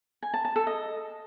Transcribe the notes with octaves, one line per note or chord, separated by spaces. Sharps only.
G#5
A5
A5
A4
D#5